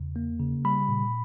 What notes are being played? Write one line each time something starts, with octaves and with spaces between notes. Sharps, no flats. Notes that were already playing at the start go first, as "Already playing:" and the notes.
Already playing: E2 C#3
A#3
C#3
G3 B5
A#2